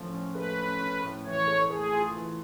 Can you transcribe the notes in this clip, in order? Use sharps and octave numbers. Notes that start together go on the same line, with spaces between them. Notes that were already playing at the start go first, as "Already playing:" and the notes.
Already playing: A2 F3 C#4
C#4
A3 B4
C#4
C#4
A2
E3 C#5
A3
A3 G#4
F4
E3